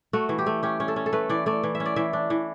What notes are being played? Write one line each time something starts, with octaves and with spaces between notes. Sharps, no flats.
A3 F#4
E3
G4
A3
C#4 G4
C#4
A4
C#4
A4
A3 B4
E3 D5
A3 D5
E3
E5
C#4
D5
E3 E5
D4
E3